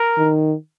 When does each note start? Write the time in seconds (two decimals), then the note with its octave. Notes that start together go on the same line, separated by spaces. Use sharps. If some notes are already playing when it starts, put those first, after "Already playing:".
Already playing: A#4
0.17 D#3